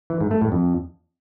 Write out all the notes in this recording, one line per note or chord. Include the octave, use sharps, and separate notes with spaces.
E3
G#2
A3
A2
F2